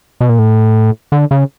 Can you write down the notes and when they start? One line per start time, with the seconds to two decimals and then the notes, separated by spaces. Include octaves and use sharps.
0.21 B2
0.29 A#2
0.39 A2
1.12 D3
1.31 C#3